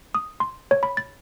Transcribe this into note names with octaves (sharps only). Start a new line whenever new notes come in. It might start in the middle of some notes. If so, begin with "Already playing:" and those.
D#6
C6
C#5
B5
A6